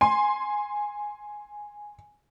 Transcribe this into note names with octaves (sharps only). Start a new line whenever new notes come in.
G#5 C6